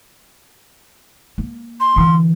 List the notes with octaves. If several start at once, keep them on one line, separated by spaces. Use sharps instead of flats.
A#3
C6
D3 E3